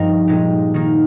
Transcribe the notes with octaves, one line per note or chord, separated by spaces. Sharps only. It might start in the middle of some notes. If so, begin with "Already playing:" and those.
Already playing: G2 F3 C4 D#4 G4 A#4
A#2 G#3 D#4 G4
D#3 A#3 D#4